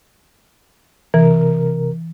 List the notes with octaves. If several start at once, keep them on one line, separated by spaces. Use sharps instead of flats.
C3 E3 A#4